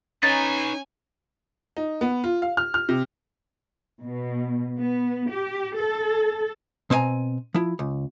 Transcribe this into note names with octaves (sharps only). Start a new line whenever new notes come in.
C#4 D#4 B4 C#5 G#5 A6
D#4
B3
F4
F5
F6
F6
C3
B2
B3
G4
A4
B2 C4 C5 D5 G#5 A#5
F3 E4
C#2